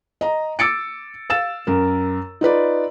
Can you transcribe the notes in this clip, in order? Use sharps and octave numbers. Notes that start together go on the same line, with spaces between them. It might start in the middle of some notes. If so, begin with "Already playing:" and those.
D#5 A#5
D6 E6 A6 C#7 D7
F5 E6 A6 E7
F#2 A#4
D#4 F4 B4 D5